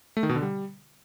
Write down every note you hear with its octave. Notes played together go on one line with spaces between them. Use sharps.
A3
D#3
B2
D3
G3